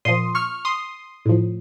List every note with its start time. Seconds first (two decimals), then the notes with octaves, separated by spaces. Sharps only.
0.05 A#2 F3 C6 D#6
0.35 C#6 F6
0.65 C6 D#6
1.25 A2 F3